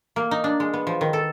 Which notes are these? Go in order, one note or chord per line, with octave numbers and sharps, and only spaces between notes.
A#3
D#4
D4
G#3
B3
F3
D#3
A4